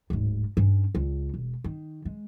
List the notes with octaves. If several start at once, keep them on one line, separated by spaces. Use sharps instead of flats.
D1 G#2
G2 C#4
C#2
E1
D#3
G#3